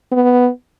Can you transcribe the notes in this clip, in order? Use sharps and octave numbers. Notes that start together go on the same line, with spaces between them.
B3